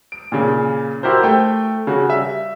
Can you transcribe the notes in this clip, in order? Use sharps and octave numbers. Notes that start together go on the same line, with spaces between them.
D7
A#2 C#3
E4 F#4 G4 A#4 C5
A3 C5 G5
C#3 F#4
G3 E5